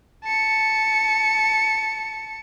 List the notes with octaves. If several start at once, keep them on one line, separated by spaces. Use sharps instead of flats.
A5 C#7